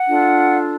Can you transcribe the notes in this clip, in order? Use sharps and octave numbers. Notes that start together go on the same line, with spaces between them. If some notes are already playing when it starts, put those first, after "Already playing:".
Already playing: F#5
D4 F4 A4